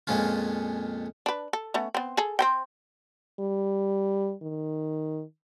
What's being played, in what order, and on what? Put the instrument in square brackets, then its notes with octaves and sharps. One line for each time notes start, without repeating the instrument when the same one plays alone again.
[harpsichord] F2 A#2 F3 G#3 C#4 F4
[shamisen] D4 B4
A4
A3 B3 C#4
B3 C4
G#4 A4
C4 C5 G5
[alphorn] G3
D#3